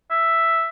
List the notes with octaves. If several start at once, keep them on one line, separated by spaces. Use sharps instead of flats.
E5